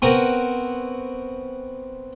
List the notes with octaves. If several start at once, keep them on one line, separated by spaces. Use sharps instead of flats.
B3 C4 F#4 A#4 G#5